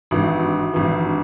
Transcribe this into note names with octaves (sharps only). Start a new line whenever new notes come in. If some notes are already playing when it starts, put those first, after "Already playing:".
G#1 G2 E3
G#1 G2 E3